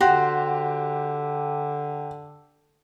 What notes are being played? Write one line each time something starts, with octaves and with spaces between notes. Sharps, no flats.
D3 F#4 G4 C5